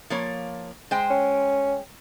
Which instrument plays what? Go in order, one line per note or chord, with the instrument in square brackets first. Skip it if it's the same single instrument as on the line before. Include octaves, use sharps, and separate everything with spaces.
[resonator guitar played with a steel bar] F3 A#3 C#5
G#3 C5 G5
[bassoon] C#4